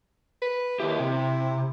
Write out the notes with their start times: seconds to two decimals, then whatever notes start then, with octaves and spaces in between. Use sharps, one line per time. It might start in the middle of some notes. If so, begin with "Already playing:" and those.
0.42 B4
0.80 D#2 E4 G4
1.00 C3